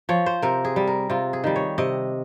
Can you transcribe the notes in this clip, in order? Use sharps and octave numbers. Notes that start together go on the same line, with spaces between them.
F3 C#5
C5
C3 A#4
G#4
G3
A#4
C3 F4
G#4
D#3 G3
C#5
C3 D#5